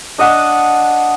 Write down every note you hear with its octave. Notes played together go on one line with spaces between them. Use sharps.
D4 D#5 F#5 A5